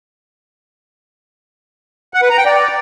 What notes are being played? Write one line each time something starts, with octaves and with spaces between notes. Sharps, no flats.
F#5
B4
A#5
G5
D5